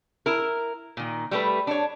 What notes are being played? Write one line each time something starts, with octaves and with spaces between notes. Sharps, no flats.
E4 A#4
A#2 D#3
G3 A3 B4
D4 C#5